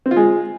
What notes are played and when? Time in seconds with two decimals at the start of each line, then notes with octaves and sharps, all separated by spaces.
0.06 C4
0.11 F4
0.17 G#3